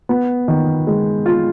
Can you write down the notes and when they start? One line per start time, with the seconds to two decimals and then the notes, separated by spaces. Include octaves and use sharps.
0.09 B3
0.48 D#3
0.87 G#3
1.26 F4